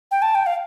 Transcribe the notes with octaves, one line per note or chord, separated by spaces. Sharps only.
G5
A5
G5
F5